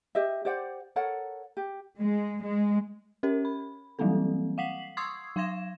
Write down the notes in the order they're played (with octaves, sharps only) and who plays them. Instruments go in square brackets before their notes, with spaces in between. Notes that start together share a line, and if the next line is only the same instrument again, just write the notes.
[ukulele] G4 D#5 E5
G4 C5 D5 F#5
A4 A#4 C#5 F#5
G4
[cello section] G#3
G#3
[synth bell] C#4 G4 A#4 C#5
B5
E3 F#3 G3 A#3 C4 A4
F5 F#5 B6 C7 F#7
C6 C#6 D#6 E6 G#6 C7
F#3 F5 C6 G#6 A#6 E7